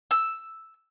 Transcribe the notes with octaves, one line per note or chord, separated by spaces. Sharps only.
E6